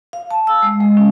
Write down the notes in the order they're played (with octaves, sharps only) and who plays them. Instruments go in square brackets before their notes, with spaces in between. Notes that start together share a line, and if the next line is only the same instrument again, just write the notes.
[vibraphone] F5
A5
E6
G#3
G#3
C#4